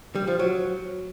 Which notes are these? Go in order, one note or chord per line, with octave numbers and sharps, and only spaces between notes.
G3
F3
F#3